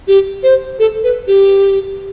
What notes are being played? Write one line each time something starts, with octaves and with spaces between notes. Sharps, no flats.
G4
C5
A4
B4
G4